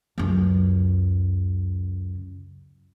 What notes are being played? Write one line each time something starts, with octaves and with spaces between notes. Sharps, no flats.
C#2 F#2